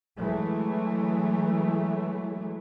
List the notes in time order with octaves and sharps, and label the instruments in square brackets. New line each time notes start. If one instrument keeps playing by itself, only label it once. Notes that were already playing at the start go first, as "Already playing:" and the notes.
[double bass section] E3 F#3 G#3 A3